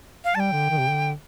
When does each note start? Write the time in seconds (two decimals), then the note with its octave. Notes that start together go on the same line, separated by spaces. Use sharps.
0.25 F5
0.35 G3 A5
0.40 G5
0.52 D3
0.70 D#3
0.79 C3
0.89 D3